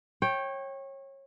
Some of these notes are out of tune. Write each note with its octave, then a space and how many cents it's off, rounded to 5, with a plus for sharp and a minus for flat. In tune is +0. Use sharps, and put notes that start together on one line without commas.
C#5 -25 G5 +0